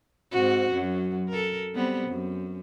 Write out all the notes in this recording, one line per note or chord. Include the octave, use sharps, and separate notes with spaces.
G#2 C4 F#4
F#2 F#3
A4 A#4
G3 B3 C4
F#2